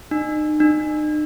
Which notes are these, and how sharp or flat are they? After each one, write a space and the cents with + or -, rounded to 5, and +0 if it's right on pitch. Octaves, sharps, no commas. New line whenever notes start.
D#4 -40
D#4 -45